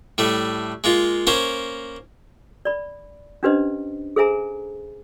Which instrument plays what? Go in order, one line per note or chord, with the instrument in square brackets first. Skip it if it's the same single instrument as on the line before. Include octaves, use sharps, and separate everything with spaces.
[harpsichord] A2 G3 A3
G#3 A#3 F4
A#3 C#4 A#4 C5
[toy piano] D5 B5
C#4 D4 G4 B4 C5 D#5
G#4 A4 C5 E5 G#5 A#5